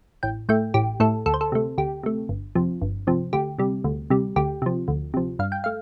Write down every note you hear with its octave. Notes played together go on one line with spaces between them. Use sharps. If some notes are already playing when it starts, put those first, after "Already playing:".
A1 G5
A2 A3 G5
A1 G4
A2 A3 A4
D2 A4
C5
A4
C3 A3
D2 G4
C3 A3
G1
F2 C3 F3
G1
F2 C3 F3
D2 G4
C3 G3
D2
C3 G3
D2 G4
C3 F3
D2
C3 F3
G2 F5
G5
A3 F5